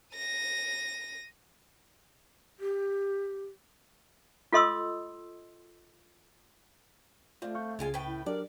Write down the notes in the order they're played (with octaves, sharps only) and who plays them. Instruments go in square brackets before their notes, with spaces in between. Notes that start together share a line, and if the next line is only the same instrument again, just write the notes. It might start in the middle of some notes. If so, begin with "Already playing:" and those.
[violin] A#6 D#7
[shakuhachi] G4
[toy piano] F4 A4 D#5 C6 D#6 E6
[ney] A3 [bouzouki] C4 [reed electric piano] F4 D5 F5
[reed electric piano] F5 C#6 G6
[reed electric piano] C#2 C#3 [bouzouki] G#3 F4 G#5
[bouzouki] A2 B4 G5
[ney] E4
[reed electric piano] F#3 D4 G4 [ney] A#4 [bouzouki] D5